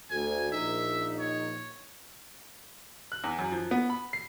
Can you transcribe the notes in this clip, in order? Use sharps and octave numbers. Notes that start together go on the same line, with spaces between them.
D2 G#5
A#1 D#4 E5
C#5
F#6
E2
F#2
F3
B3
B5
C7